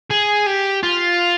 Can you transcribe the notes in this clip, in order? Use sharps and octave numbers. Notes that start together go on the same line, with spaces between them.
G#4
G4
F4